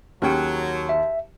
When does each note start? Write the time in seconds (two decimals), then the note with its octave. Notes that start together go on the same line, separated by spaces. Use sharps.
0.22 D#2 F#3 C#4 G#4 G5
0.89 E5